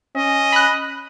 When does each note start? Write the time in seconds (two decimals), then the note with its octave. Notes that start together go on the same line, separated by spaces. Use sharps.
0.16 C#4 D#5
0.53 B5 F#6